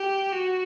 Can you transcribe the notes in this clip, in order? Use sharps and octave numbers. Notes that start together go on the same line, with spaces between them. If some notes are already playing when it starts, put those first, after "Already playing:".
Already playing: G4
F#4